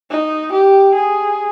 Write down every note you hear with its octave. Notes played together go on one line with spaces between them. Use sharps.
D#4
G4
G#4